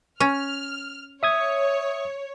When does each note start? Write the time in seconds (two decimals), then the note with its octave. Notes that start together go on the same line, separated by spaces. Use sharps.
0.20 C#4 F6
1.23 C#5 E5 D#6 G#6